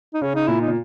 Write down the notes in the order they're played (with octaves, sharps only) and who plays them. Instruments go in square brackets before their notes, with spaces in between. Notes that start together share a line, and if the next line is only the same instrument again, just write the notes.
[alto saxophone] D#4
[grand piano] C#3 [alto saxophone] C#4
[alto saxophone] D#4
[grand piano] A#2 [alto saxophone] E4
[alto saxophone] D#4
[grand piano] A#2